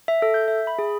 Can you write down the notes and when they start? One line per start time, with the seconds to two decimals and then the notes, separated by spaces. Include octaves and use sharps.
0.08 E5
0.22 A4
0.34 G6
0.48 E5
0.67 B5
0.79 G#4